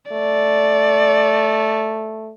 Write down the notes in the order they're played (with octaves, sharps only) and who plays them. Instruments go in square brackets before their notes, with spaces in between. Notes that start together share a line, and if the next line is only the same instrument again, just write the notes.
[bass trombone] A3 [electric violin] D5